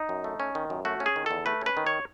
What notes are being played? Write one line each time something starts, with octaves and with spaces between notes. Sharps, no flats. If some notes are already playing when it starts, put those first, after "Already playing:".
Already playing: D#4
F#2
A3
C#4
D#3
F#2
A3 F#4
C#4
G#4
D#3
E2 A4
A3 B4
C#4 B4
D#3
C#5